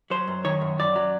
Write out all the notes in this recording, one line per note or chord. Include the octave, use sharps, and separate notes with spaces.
F#3 C5
F#2
D#3 C#5
F#2
F#2 D5
F#3